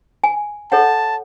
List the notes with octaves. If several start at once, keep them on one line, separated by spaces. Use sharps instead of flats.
G#5
A4 C#5 F#5 A5